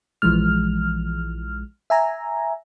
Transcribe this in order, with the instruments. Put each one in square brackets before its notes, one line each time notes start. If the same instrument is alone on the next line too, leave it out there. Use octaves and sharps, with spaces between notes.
[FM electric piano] A#1 E3 F3 G#3 F6
E5 G#5 A#5